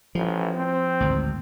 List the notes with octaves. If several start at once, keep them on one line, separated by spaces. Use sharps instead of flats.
A1 F3
C4
G#1 D2